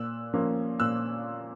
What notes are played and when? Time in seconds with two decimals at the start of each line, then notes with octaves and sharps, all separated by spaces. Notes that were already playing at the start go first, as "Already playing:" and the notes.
Already playing: A#2 E6 F#6
0.34 F3 A#3 C#4
0.80 A#2 E6 F#6